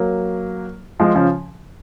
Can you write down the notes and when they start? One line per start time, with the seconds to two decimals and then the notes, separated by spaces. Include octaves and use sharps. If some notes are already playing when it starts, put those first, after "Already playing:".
Already playing: F#3 A#3
1.00 F3 G#3
1.15 C#3 F3